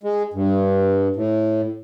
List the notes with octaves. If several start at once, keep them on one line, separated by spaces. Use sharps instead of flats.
G#3
G2
A2